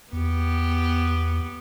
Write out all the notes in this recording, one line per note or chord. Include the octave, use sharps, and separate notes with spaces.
E2 B3 G4